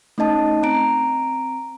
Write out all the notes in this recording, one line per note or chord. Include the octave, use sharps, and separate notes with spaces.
A3 C#4 D#4 D#5 A5
C4 A#5 D7